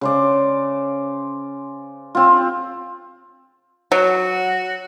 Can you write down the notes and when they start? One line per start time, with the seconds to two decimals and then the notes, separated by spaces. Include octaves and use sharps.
0.01 C#3 C5 D5
2.15 C4 F4
3.92 F#3 F#4